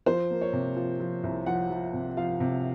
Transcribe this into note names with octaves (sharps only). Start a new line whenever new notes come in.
F3 C5
A#3
C#5
C3
F3
F3
C2
F3 F#5
F3
C3
F3 F5
C3